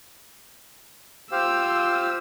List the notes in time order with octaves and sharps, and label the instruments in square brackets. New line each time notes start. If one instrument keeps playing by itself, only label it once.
[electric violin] F4 E6 [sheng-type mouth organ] G4 C5 F5